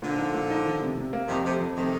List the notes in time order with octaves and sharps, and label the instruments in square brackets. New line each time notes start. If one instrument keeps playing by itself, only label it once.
[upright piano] A#2 [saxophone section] D3 F3
[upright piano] D#4
A#2
D#4
D#3
C3
C3
A#3
[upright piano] F2 [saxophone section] C3 D#3
[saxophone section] C3 [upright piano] A3
[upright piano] F2
[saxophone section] C3 D#3 [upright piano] A3